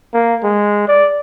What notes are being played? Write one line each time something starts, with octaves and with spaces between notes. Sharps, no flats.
A#3
G#3
D5